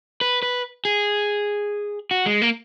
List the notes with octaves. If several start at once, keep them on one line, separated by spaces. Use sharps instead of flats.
B4
B4
G#4
F#4
G#3
A#3